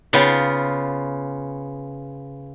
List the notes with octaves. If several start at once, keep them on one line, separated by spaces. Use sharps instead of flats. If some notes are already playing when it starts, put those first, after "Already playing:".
C#3 B3 F4 G5